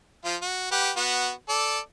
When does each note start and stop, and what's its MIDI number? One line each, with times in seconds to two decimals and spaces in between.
0.25 0.36 53
0.25 0.36 65
0.42 0.69 66
0.72 0.90 67
0.72 0.90 71
0.72 0.90 78
0.97 1.30 59
0.97 1.30 66
1.49 1.79 69
1.49 1.79 74